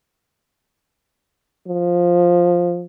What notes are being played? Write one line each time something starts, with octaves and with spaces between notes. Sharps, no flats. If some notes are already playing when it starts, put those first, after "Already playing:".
F3